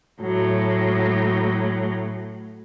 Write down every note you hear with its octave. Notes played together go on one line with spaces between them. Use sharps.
A2 F#3